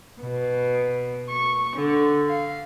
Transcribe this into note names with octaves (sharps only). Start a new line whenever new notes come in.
B2
C#6
D3
F5